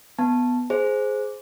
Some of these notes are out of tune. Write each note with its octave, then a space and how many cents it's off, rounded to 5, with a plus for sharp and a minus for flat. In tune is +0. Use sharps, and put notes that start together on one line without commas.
B3 +0 A5 +0
G#4 +10 C5 +0